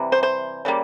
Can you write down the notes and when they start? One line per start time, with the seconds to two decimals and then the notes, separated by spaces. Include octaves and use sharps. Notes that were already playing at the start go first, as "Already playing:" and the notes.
Already playing: C3 E3 G3
0.12 C5
0.23 C5
0.65 C#3 E3 G3 A#3